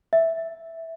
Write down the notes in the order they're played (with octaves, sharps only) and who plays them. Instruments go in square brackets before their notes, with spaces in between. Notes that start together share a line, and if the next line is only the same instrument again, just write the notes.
[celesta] E5